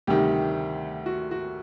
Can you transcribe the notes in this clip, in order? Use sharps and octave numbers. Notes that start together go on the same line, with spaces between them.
D2 C3 D#3 G3 G4
F#4
F#4